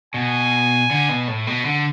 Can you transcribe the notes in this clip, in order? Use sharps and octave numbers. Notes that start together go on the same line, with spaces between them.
B2 G#5
D3
B2
A2
B2
D3